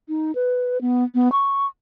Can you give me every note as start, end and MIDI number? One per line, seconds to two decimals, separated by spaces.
0.08 0.32 63
0.35 0.81 71
0.81 1.04 59
1.15 1.31 59
1.32 1.66 85